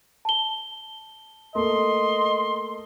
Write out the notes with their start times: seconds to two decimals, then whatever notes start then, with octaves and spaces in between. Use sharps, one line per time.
0.25 A5 G7
1.55 A3 A#3 D#5 C6